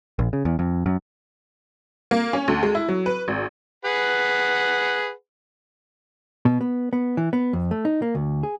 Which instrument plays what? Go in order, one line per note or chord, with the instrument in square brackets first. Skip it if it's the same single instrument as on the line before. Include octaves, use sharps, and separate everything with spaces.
[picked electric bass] A#1
C#3
E2
F2
F#2
[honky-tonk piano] A#3
C#4
D2
G#3
E4
F#3
B4
G#1
[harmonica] G#4 B4 F#5
[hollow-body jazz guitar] B2
B3
B3
E3
B3
F2
A3
D#4
A#3
D2
G#4